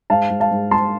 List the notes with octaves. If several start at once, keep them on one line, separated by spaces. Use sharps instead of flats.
G#2 F5 A5
G#2
F5 A5
G#2
G#2 A5 C6